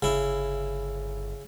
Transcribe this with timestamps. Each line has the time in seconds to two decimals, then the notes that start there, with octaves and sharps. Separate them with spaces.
0.02 G1 C#3 E4